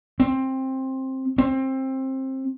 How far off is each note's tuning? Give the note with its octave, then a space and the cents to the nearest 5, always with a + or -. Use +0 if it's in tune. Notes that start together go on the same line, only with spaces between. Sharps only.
C4 +15
C4 +20